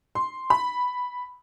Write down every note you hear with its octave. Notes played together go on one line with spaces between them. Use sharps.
C6
B5